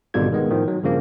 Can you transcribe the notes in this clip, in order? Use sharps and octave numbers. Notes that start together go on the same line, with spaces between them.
G#1 B2 D3 G3 F4 G#6
D#3 G#3 B3
A2 D#3 F3
F#3
G2 C#3 F3 A#3